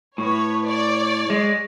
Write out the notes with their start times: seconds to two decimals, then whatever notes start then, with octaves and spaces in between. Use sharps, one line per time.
0.18 A2 B4 C#5
0.63 C#5 D5
1.30 G#3